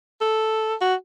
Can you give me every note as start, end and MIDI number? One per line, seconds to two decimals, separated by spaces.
0.21 0.75 69
0.81 0.95 66